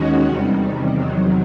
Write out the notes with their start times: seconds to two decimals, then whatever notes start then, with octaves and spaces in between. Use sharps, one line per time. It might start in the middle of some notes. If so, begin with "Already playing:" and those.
Already playing: D#2 D#3 G#3 C#4 F#4
0.26 E2 C3 D#3 G3
0.92 E2 C3 D#3 F#3